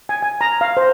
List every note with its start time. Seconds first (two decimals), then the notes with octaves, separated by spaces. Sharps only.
0.09 G#5
0.22 G#5
0.41 A#5
0.61 F5
0.77 C5